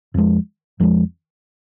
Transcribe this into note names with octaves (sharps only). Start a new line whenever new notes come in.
F2 F3 G#3
F2 F3 G#3